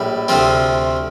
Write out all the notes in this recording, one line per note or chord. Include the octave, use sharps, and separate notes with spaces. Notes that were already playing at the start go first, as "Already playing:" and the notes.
Already playing: A#1 A2 G3
D2 C3 F3 C4